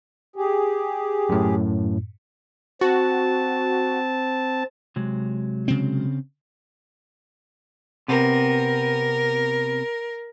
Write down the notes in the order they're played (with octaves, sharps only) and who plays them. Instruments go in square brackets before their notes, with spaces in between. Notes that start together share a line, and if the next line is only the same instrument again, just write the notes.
[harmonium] G4 G#4
[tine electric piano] F#2 A2
[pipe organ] C4 A5 [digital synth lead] F#4
[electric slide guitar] C3 F#3 G#3
[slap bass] C#3 C4
[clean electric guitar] C3 B3 C4 [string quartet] A#4